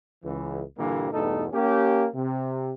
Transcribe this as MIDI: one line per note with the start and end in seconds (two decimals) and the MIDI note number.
0.25 0.62 37
0.25 0.62 52
0.78 1.08 43
0.78 1.08 46
0.78 1.08 50
0.78 1.08 52
0.78 1.08 55
0.78 1.08 58
1.13 1.46 40
1.13 1.46 43
1.13 1.46 47
1.13 1.46 57
1.13 1.46 63
1.13 1.46 69
1.53 2.06 58
1.53 2.06 61
1.53 2.06 67
2.15 2.73 48